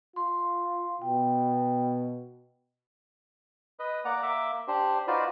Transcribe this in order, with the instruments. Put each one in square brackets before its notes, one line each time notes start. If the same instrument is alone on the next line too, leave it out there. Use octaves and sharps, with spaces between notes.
[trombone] F4 [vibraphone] C6
[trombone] B2 [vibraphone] G5
[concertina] B4 D#5
A#3 D5 F#5 A#5
A#3 E5 D6
D4 G4 C5
D#4 F4 F#4 B4 C5 D5